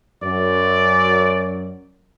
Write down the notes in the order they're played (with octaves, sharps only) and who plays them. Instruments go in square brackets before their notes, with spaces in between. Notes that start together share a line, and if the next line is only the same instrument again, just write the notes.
[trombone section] F#2 [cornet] D5